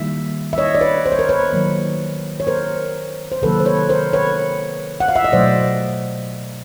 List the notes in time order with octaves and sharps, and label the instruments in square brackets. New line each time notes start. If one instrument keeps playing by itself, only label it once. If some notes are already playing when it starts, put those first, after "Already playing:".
Already playing: [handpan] D#3 G3 A#3 E5
E5
C#5 D#5
D5
B4 C#5
C5
C#5
A#4 C5
B4 C#5
D#3 F#3 A#3
C#5
A#4 C5
C5
C3 D#3 F#3 A#3 A4 B4
C5
B4 C#5
A#4 C5
B4 C#5
F#5
F5
E5
D#5
B2 F#3 A3 C5 D5